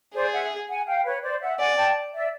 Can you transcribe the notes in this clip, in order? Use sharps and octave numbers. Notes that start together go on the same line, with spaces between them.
G#4 C5 D5
E5 F#5
F#5 G#5
F5 G5
B4 C#5
C5 D5
E5 F#5
D5 F#5 G#5
G5 A5
D5 E5